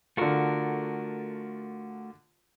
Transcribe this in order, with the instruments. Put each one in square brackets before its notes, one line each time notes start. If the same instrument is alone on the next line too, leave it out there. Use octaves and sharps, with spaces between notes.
[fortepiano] D3 F4 [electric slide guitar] A3 F#4 A#4